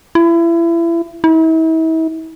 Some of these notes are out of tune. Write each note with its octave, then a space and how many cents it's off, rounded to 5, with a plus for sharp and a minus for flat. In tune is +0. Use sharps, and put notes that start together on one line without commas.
E4 +30
E4 -40